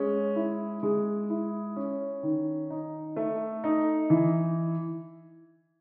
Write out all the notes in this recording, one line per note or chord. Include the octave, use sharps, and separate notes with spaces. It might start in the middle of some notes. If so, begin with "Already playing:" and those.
Already playing: G#3 C#4
E4
G#3
E4
C#4
D#3
D#4
A3
D#4
E3